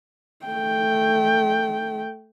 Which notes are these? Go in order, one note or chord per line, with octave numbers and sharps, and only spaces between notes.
A3 G5